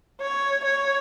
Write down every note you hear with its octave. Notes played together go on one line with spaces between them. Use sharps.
C#5
C#5